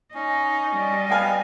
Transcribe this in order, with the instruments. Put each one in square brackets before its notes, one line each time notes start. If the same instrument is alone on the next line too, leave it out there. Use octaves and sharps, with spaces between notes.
[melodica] C#4 [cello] D#4
[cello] G3 D#5
[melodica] B3 F5 [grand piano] G5 G#5 F6